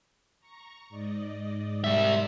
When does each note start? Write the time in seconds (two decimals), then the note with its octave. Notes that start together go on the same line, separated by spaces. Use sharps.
0.40 A#5 C#6
0.89 G#2 D5 D#5
1.84 G3 E5